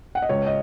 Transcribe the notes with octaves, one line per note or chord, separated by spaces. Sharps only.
F#5
D#5
C#2 C#5
D#5